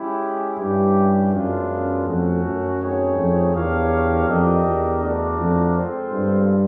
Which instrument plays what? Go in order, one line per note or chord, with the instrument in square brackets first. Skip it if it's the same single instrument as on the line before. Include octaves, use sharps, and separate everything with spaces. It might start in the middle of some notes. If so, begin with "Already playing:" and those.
Already playing: [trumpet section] G#3 C#4 E4 G4
[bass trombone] G2 [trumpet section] C#4 E4 G4
[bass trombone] F#2 [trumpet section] G#3 B3 D4 F4
[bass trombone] F2 [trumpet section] A3 C#4 F#4
[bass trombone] F#2
[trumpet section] A3 C4 D#4 G#4 C#5
[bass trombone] F2
[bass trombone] E2 [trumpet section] D4 G4 A#4 C#5 F5
[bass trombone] F2 [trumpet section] D4 G4 A#4 D#5
[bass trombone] E2
[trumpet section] A3 D4 F#4 A#4 D5
[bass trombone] F2
[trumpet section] G#3 C4 F4 A4 C5
[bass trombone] G2